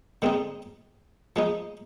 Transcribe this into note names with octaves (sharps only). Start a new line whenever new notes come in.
D3 G#3 C4 D#4
F3 G#3 D#4